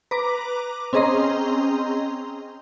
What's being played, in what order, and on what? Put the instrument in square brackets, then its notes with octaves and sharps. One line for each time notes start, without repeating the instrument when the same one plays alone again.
[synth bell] B4 A#5 D6
C4 C#4 G#4 D#5 A#5 C6